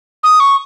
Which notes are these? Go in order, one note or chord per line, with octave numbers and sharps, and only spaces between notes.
D#6
C#6